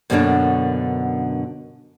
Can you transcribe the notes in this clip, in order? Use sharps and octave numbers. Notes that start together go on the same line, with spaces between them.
F#2 B2 D3 G#3 A#3 D4